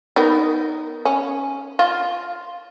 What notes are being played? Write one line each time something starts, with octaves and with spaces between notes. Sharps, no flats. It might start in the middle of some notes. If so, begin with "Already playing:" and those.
B3 D#4 A#4
C#4
F4